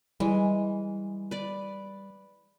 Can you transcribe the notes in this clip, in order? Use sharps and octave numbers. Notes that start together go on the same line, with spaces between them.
E3 G3 G#3
B4 D5